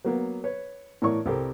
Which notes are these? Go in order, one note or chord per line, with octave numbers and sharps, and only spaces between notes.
F#3 A#3 B3
B4 C#5
A2 E3 A#4 C#5 D5 C#6
C2 C3 G4 A4 A#4 C5